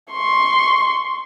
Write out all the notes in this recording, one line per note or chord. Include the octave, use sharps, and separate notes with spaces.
C6 C#6